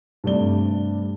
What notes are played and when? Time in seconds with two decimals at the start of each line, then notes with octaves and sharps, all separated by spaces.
0.24 G2 C3 A3 D5 G7